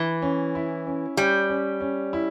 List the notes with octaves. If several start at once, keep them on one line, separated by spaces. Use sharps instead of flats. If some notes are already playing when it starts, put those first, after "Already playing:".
Already playing: E3
C#4
E4
C#4
G3 C#4
C#4
C#4
E4